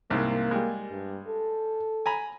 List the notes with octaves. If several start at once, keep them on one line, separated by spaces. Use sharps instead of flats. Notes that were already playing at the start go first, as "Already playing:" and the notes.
C2 G#2 A#3
G3 G#3
G2
A4
G#5 A#5 B5